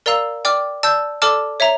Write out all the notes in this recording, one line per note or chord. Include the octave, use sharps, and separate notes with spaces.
A#4 D5 F5 A#5 E6
D5 G5 D6 F6
D5 A5 E6 G6
A4 D5 A5 D6 F6
C#5 E5 A#5